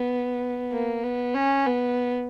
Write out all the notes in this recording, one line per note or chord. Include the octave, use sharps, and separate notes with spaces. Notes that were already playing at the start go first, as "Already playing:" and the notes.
Already playing: B3
A#3
B3
C#4
B3